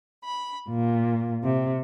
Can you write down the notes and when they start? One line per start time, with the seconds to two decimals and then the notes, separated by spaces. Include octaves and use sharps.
0.23 B5
0.70 A#2
1.44 C3